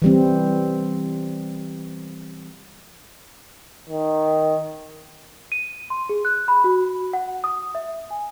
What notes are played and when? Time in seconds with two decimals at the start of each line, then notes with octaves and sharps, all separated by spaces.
0.02 E3 G3 C4
3.89 D#3
5.52 D#7
5.90 C6
6.09 G#4
6.25 F#6
6.48 B5
6.64 F#4
7.13 F#5
7.44 D#6
7.75 E5
8.11 G#5